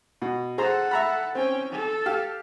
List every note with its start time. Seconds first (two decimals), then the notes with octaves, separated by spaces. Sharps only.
0.22 B2
0.58 G#4 A4 C5 F#5 A#5
0.91 E5 A#5 B5
1.35 C4 C#4 G5
1.72 A4
2.06 G4 F5